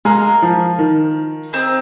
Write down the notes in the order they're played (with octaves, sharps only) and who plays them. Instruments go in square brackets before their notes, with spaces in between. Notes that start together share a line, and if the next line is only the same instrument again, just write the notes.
[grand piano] G#3 [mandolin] D#4 A#4 F5
[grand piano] F3
D#3
[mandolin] C4 D#4 G#4